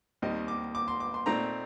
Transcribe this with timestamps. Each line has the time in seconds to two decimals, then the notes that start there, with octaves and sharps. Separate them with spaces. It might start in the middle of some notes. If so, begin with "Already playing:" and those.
0.22 D#2 D#3 G3 C4 D#5
0.48 D6
0.75 D6
0.88 C6
1.00 D6
1.14 C6
1.26 A#2 A3 C4 D#4 A#5